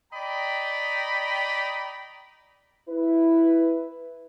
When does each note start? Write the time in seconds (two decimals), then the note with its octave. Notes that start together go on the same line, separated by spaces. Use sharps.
0.13 D5 D#5 G5 A#5 B5
2.89 E4 B4